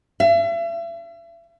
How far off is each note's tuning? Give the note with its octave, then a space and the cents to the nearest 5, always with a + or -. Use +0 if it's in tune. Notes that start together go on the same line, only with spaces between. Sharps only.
E5 +40